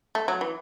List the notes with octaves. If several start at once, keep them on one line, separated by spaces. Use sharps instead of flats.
A3
F#3
E3